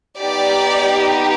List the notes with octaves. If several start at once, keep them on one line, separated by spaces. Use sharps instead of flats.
B3 D#4 G4 D5